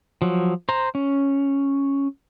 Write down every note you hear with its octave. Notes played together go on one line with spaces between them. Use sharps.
F3 F#3
C5 A#5
C#4